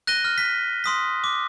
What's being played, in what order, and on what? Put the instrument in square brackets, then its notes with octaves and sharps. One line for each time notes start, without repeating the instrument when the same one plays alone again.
[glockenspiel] F#6 A#6 D#7 G7
F6
B6
C6 D#6 B6
D6